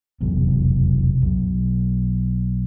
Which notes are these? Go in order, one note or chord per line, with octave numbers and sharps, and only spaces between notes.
F1 B1 E2
B1